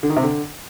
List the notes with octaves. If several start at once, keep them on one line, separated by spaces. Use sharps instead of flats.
D3
D#3
C3
D3